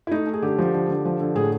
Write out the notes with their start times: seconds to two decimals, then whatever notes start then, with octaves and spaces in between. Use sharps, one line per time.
0.07 E4
0.11 A3 D#4
0.26 A3
0.33 G#4
0.42 D3 G4
0.58 F3
0.74 D3
0.89 D3
1.05 F3
1.20 D3
1.35 A2 G#4